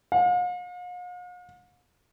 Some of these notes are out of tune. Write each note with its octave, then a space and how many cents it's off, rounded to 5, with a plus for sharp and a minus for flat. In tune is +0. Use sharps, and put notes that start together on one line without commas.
F5 +45